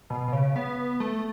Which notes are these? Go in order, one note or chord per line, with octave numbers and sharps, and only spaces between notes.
B2
B2
C#3
B3
A3